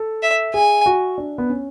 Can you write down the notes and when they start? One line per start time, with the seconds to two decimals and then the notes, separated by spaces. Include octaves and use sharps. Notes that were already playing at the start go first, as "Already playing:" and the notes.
Already playing: A4
0.23 E5
0.54 G#4 G#5
0.86 F#4
1.18 D4
1.38 B3
1.50 C#4